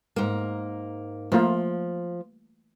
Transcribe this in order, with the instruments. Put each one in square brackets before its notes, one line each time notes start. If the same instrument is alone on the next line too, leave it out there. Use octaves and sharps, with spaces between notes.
[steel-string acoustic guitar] G#2 A#3
[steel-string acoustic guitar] F3 [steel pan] A3 A#3 F4